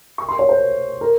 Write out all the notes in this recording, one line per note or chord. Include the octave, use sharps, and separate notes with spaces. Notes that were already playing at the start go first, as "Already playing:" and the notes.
C#6
C6
C#5
C5
A#4